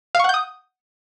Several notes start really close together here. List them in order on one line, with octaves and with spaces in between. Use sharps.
F5 C#6 F#5 G6 D#6